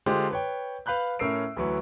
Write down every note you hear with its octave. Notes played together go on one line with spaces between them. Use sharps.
D3 G#3 D4 F4 G4 C5
B4 C#5 G5
B4 F5 B5 F#6 G6
A2 C#4 A#4 E6 C7 D7
D2 E3 F#3 B4 C#6